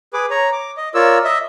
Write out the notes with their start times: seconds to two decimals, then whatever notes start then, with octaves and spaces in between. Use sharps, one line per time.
0.13 G#4 B4 D6
0.30 C#5 A#5
0.53 D6
0.77 D#5
0.94 F4 A#4 C#5 D5 E6
1.24 D#5 E5